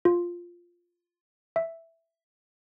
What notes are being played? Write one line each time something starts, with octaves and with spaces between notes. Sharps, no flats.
F4
E5